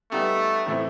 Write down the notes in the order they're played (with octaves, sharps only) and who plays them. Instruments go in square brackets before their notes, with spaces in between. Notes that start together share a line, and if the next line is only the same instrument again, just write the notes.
[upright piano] G3 B3 D#4 G4 [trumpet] A3
[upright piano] A2 E3 A3 C4 E4